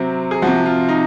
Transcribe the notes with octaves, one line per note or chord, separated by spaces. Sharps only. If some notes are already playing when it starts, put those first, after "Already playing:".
Already playing: C3 F#3 C4
G#4
C3 F3 F#4
F4
D#4